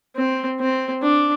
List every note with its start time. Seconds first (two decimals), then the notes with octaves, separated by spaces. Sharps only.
0.16 C4
0.60 C4
1.02 D4